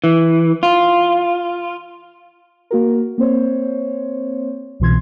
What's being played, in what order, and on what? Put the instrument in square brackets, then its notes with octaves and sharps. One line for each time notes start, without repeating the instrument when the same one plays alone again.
[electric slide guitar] E3
F4
[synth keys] A#3 F#4 A#4
A#3 C4 C5 C#5
C2 B2 E3 C6 G#6